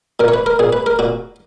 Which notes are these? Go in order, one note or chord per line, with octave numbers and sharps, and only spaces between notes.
A#2 A#4
C#5
B4
A#4
A#2 G#4
B4
A#4
A#2 F#4